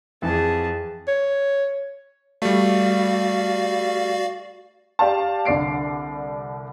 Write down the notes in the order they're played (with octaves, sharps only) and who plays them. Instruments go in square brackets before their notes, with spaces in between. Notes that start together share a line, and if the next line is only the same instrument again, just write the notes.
[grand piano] F2 E3 [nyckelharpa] G#4 A5
[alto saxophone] C#5
[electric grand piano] G3 A3 [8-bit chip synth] F#4 D5 F5
[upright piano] G4 D5 F5 A5
C2 D3 D5 C7 D7